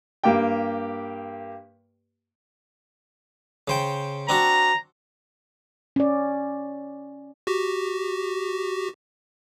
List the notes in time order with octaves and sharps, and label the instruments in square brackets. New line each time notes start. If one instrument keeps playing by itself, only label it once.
[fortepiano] G2 A#3 G4 G5
[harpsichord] C#3 C5 G5
[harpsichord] C4 D4 F#4 [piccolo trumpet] A#5
[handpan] C#4 D5
[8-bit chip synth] F#4 G4